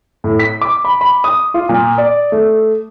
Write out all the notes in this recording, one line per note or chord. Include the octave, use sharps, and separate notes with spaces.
A2
B6
D6
B5
B5
D#6
F4
A#2
D5
A3